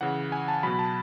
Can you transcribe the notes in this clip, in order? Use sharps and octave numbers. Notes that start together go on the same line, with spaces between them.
C#3 E3 F#5
G#5
A5
B2 F#3 B5
A5